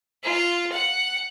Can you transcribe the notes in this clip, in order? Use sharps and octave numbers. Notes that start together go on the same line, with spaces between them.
F4
F#5